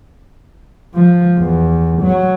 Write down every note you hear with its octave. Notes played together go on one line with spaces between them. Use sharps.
F3
E2
F#3